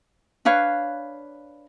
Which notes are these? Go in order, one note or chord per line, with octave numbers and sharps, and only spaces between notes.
D4 B4 C#5 F5